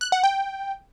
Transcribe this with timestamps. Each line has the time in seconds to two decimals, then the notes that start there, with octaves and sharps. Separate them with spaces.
0.01 F#6
0.12 F#5
0.24 G5